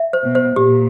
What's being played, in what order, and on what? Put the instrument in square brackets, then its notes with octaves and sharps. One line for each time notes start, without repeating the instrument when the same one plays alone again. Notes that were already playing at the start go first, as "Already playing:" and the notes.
Already playing: [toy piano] E5
C5
[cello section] B2
[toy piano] C5
[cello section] A#2 [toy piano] G4